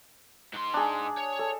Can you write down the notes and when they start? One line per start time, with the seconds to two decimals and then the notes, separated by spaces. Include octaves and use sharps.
0.53 G#2 C6
0.74 D4 G#4
1.18 C#5
1.39 A4